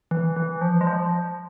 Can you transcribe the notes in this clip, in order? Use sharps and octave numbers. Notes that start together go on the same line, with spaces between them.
E3
E3
F3
G#3
F3